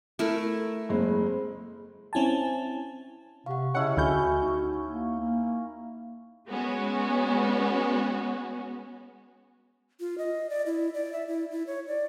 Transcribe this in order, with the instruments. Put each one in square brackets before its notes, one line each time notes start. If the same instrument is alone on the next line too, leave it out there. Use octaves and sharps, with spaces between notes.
[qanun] A3 E4 A#4
[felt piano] F#1 G#3 C4
[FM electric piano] C4 C#4 E4 G#5 A5
[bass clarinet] C3 [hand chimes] F5 F#5 [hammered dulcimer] C#6
[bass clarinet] C#3 [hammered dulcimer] C#4 E4 A5 [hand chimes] C#5 D#5 G5 [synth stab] F#5
[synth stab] D2 G6 [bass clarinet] F#4 [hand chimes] G#5 B5 F6
[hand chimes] D#4
[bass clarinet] A#3
A#3
[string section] G#3 B3 C#4 F#4
[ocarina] F4
D#5
D5
E4
D5
E5
E4
E4
C#5
D5